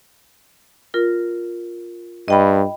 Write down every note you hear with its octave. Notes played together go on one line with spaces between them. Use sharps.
F4 A#4
G2 D#5 G5 B5